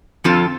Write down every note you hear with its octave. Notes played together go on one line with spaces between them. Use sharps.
F2 F3 C4 F4 A4